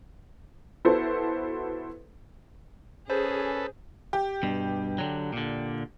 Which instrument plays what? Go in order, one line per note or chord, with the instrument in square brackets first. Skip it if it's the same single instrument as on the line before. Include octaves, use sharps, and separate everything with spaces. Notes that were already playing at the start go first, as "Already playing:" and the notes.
[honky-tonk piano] B3 E4 F#4 A4 B4 C5
[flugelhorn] C#4 [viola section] G#4 [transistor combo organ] A4 B4 [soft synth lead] C5
[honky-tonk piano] G4
[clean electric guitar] G2 B2
D3 F#3
A#2 D3